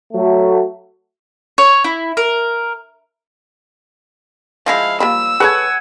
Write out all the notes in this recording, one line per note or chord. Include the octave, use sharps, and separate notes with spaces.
F#3 A3
C#5
E4
A#4
F3 G#3 E4 F5
F3 G3 A#3 B5 E6
G#4 A4 B4 C#5 F#5 G#5